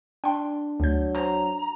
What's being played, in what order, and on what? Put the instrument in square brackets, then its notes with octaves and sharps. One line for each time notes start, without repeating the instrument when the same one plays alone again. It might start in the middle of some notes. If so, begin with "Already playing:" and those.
[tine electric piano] D4 [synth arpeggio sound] G5 C6
[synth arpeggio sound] D2 G6 [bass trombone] F#3
[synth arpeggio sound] C5 [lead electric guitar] A#5